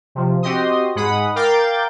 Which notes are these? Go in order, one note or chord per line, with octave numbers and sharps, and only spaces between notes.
C3 F3
C4 F#4 G4 D#5 C6 D#6
G#2 G#3 F#5 B5 D#6
A#4 F5 G5 D6 G6 A6